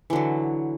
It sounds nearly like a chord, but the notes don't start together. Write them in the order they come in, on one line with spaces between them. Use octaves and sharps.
E3 D3 F#3